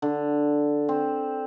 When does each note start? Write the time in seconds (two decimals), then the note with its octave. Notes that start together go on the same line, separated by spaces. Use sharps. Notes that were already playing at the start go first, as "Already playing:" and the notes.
0.02 D3
0.89 C4